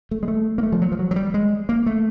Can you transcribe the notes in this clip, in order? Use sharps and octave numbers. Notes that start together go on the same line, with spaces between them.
A3
G#3
A3
A#3
A3
F3
F#3
F3
F#3
F#3
G3
G#3
A#3
A3